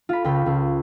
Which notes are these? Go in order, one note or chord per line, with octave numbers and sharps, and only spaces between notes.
F4 B5
C#2 G5 B5
C#2